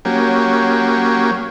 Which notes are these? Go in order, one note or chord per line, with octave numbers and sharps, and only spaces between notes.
F#3 A#3 C#4 G4